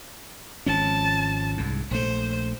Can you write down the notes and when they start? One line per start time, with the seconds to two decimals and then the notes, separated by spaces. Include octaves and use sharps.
0.66 G#1 F3 C#4 A5
1.57 C2 G#2
1.91 A#1 A3 C5